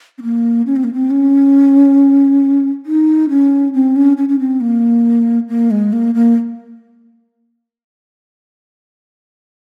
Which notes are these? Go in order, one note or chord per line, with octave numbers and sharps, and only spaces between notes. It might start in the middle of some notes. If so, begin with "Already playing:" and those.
C4
A#3
C#4
C4
A#3
C4
C#4
D#4
C#4
C4
C#4
C#4
C#4
C4
A#3
A#3
G#3
A#3
A#3